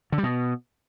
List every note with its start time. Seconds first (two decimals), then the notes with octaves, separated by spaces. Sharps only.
0.12 D3
0.18 G3
0.23 B2